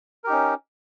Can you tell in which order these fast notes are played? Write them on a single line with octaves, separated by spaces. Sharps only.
A#4 G4 D#4 C#4